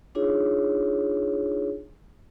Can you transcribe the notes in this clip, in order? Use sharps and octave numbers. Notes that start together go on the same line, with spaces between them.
D4 D#4 F4 G#4 C#5